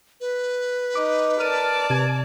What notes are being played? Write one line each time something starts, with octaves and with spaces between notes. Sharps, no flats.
B4
D#4 D6
A#4 D5 A5 F6 D#7
C3 G#6